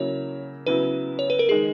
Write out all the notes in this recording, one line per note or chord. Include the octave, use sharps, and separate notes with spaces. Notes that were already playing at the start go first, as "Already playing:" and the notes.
Already playing: C#3 F#3 A#3 E4 C#5
C#3 F#3 B3 E4 B4
C#5
B4
A#4
D#3 G#3 D#4 G#4